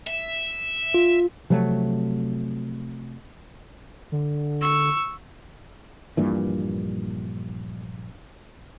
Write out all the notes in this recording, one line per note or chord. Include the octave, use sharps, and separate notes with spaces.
E5
F4
C3 F3 F#3 A3
D3
C#6 E6
A#1 G2 A#2 E3